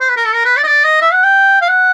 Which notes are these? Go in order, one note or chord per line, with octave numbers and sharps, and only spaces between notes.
C5
B4
A#4
A4
A#4
B4
D5
D#5
D5
D#5
E5
F#5
G5
F5
F#5